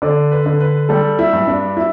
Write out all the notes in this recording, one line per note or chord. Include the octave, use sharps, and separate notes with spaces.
D3 D5
B4
D3
B4
G3 A4
E4
G2
D4
E4